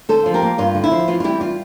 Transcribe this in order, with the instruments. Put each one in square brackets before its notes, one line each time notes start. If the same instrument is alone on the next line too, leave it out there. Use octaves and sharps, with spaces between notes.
[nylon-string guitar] D3 A4 C5
F3
G4 A#4
A#3
G2 F4
D3
E4
F3
E3 F4
F4
G3 E4 G4
F4